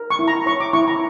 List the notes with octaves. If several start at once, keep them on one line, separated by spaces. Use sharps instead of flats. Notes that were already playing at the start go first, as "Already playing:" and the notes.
Already playing: A#4
C#6
E4
A#5
C#5 C#6
D6
E4 C#6
A#5